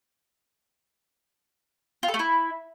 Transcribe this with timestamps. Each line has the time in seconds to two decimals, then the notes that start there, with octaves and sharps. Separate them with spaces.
2.03 F4
2.08 A4
2.14 A3
2.19 E4